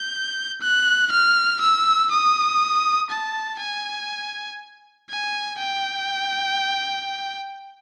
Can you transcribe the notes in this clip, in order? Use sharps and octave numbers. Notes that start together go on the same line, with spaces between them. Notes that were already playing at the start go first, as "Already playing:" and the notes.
Already playing: G6
F#6
F6
E6
D#6
A5
G#5
G#5
G5